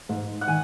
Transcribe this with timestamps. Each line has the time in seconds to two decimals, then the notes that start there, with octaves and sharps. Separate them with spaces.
0.09 G#2
0.41 F#5
0.47 D#3 G#5